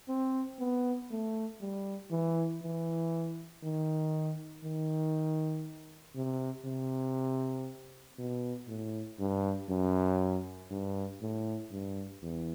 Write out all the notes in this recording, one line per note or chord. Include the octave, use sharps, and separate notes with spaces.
C4
B3
A3
G3
E3
E3
D#3
D#3
C3
C3
B2
A2
G2
F#2
G2
A2
G2
E2